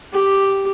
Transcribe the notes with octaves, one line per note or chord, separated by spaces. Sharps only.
G4